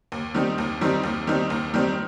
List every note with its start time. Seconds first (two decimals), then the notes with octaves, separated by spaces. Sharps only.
0.12 D#2
0.35 D#3 G3 C4 D#4
0.58 D#2
0.81 D#3 G3 C4 D#4
1.03 D#2
1.27 D#3 G3 C4 D#4
1.50 D#2
1.74 D#3 G3 C4 D#4